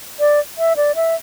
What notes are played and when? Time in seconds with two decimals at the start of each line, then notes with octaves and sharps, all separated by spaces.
0.20 D5
0.58 E5
0.76 D5
0.95 E5